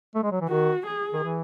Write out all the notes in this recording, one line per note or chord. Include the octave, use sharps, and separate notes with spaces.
A3
G#3
F#3
E3
D#3 F#4
G#4
D#3
E3